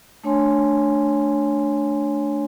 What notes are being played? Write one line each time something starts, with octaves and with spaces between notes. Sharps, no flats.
A3 D4 C#5 G#5 C6